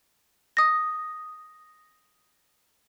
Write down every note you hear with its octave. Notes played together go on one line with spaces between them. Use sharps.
D#6 A#6